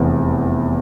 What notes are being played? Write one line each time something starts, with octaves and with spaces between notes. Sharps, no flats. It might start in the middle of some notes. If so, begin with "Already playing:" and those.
Already playing: F1 E2 E3